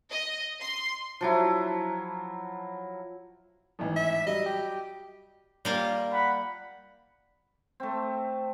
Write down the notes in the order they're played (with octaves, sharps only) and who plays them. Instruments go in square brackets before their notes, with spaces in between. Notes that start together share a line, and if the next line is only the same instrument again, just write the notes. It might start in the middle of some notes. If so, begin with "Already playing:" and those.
[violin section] D#5
C6
[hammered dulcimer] F3 F#3 E4
[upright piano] A1 G#2 E3
[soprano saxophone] E5
[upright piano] F#3 G3 [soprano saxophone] D#5
[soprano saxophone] G4
[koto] G3 A#3 F4
[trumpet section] F#5 B5
[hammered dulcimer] A3 C4